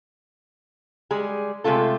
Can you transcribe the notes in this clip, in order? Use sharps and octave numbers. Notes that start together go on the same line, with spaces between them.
G3 G#3 G#4
C3 G#3 A3 F4 A4